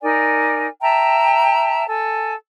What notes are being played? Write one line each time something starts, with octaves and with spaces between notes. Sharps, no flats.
D#4 A#4 D5 G#5
E5 G5 A5 A#5
A4 G#5